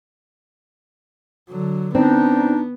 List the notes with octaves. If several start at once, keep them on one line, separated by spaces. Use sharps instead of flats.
D3 F#3
B3 C4 D4 D#4